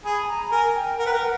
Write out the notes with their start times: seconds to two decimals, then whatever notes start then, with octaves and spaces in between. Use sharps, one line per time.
0.04 G#4 B5
0.23 A5
0.28 A#5
0.52 A#4 G#5
0.75 G5
0.99 A#4 F#5
1.06 B4
1.09 A#4 G5
1.20 F#5